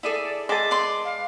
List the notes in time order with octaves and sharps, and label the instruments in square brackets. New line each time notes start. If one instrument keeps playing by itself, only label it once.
[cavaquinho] E4 G#4 A4 [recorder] D5
[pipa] G#3 A5 [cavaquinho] E5 [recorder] D6
[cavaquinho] B4 D5 C6
[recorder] F5